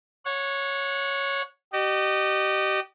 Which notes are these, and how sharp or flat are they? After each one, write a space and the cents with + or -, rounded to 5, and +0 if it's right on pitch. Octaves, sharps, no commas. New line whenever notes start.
C#5 +0 F#5 -25
G4 -30 D#5 -30